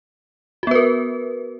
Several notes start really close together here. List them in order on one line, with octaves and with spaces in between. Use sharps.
F#4 B3 B4 A#4